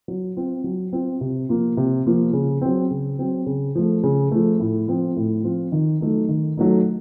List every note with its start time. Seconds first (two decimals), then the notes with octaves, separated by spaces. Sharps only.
0.08 F#3
0.37 C4 F4
0.64 F#3
0.93 C4 F4
1.21 C3
1.49 F3 A#3 F4
1.77 C3
2.06 F3 A#3 F4
2.33 C#3
2.61 F#3 C4
2.91 C#3
3.19 F#3 C4
3.46 C#3
3.75 F3 A3
4.03 C#3
4.31 F3 A3
4.60 A2
4.88 F3 C4 F4
5.16 A2
5.44 F3 C4 F4
5.72 D#3
6.01 F#3 A3 D#4
6.29 D#3
6.57 F#3 A3 D#4